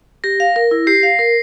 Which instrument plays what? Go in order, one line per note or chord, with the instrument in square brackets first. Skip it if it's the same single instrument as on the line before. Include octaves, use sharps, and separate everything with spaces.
[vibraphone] G4 [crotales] A#6
[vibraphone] F5
A#4
E4
[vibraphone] G4 [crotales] C7
[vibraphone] F5
A#4